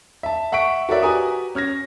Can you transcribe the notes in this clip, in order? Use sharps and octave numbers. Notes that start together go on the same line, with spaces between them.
E5 A5
E5 F#5 C#6 B6 D7
F#4 A4 A#4 C#5 D5 E5
F#4 G4 B4 G#5 A#5 D#6
C#4 F6 G#6 A#6